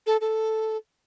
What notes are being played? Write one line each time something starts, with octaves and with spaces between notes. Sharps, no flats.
A4
A4